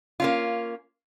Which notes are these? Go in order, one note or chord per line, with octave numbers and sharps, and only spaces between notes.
A#3 C#4 F4